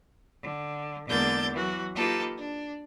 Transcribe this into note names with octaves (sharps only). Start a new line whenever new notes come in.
D3
E2 D3 G#3 A#3 G6 A6
E3 F#3 F#4
A#3 D#4 F4 G4 A4 B4
D4